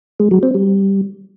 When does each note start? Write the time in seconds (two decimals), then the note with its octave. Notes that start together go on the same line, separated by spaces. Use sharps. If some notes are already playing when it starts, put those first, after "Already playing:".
0.20 G#3
0.31 F#3
0.43 C4
0.54 G3